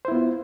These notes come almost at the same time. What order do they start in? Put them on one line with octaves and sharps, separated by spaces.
C5 E4 B3 F4